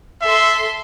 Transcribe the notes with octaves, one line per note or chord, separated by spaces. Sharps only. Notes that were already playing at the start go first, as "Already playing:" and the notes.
A4 E5 C6